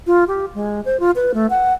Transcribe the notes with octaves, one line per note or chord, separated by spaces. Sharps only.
F4
G4
G#3
C5
F4
B4
A3
F#5